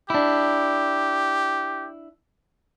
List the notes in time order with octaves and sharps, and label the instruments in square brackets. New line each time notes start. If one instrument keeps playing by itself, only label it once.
[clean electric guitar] D4 E4 [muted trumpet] G4